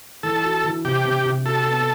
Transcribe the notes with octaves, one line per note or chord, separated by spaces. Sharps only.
E3 A4
F#4
E3
C3 G4
C3
C3
F#4 A4
B3